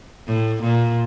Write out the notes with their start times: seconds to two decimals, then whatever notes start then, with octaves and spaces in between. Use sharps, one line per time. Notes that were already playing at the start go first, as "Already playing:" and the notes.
0.28 A2
0.63 A#2